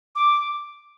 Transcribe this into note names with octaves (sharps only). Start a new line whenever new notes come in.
D6